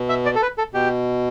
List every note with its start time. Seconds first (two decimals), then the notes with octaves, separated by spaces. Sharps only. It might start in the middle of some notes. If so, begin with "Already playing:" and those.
Already playing: B2
0.09 E5
0.26 D5
0.36 A4
0.42 B4
0.58 A4
0.74 B2 G4